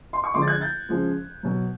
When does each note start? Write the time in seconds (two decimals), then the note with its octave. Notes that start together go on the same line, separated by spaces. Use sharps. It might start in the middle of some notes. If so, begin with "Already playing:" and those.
0.13 C6
0.24 C#6
0.34 D3 F3 G#3 C6 D6
0.42 A6
0.47 F#6 G#6
0.61 G6 A6
0.89 C#3 F3 G#3
1.43 B2 F#3